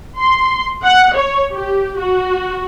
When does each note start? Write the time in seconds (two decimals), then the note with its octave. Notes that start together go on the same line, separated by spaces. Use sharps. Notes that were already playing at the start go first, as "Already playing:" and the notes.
0.18 C6
0.84 F#5
1.15 C#5
1.52 G4
2.00 F#4